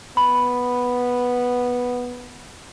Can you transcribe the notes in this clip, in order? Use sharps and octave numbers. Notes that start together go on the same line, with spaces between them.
B3 B5